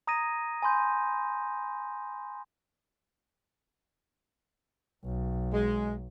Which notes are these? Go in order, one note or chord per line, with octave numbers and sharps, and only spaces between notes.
A#5 D#6 G#6 A#6 D#7
G#5 B5 C6 G6
B1
G#3